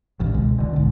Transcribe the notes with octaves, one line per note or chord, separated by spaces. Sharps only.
A1 D2 E3
F1 C#2 B2 G#3
F1 D3
B1 G#2